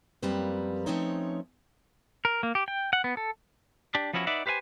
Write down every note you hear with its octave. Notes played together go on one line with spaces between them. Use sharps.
F#2 F3 G3 A#3 C4 B4
F3 A3 C4 C#4 D#4 C#5
A#4
A#3
G4
G5
F#5
B3
A4
D4 G4
F3 B3 C#4 E4 F#4
D#4 B4 D5 E5 F#5
G4 B4 C5 F5 G#5